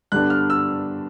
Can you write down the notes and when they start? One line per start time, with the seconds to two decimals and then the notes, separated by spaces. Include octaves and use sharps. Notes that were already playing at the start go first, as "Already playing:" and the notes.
0.12 G2 D3 G3 B3 D4 F#6
0.30 F6
0.50 E6